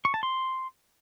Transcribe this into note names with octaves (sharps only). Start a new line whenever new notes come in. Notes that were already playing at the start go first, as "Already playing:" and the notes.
C#6
A5
C6